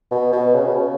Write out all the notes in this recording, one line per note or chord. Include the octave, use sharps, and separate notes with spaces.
B2
B2
C#3
B2
C#3